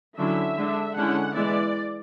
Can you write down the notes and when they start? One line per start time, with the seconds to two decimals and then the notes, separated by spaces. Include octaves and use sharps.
0.18 D3 F#3 C#4 E4 E5
0.57 D3 G#3 D4
0.96 D3 G#3 C#4 E4 F#5
1.35 E3 G#3 B3 E4 D5